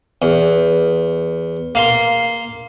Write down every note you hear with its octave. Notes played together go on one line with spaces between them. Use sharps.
E2
A#3 F5 C6